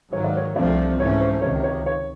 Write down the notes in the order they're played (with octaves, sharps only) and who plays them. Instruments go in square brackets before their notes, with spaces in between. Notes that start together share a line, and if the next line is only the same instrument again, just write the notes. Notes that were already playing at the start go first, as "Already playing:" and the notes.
[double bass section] G#2 D#3 F#3 [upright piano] C#5
[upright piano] D5
C#5
[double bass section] C2 C3 F3 A3 C4 [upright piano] D4 D5
[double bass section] G#2 E3 A3 C#4 [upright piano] C#5
[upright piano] C5
[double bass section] C#2 C3 D#3 [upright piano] C#5
[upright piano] C#5
C#5